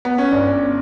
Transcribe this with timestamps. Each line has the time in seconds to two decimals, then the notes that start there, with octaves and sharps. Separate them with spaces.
0.05 B3
0.18 C#4
0.31 G1 D4